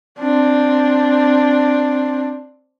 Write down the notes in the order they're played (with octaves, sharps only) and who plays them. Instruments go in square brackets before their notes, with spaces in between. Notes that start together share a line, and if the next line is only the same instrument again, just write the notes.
[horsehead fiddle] C4 D4